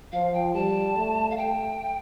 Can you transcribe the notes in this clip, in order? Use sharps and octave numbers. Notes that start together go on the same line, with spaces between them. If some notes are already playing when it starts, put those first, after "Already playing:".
F3 F5
G5
G3 A5
A3
F5
A3 G5